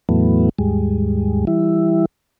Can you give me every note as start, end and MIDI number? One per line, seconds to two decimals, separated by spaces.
0.09 0.49 40
0.09 0.49 45
0.09 0.49 52
0.09 0.49 54
0.09 0.49 57
0.09 0.49 59
0.59 1.45 39
0.59 1.45 44
0.59 1.45 55
0.59 1.45 56
1.47 2.05 52
1.47 2.05 55
1.47 2.05 64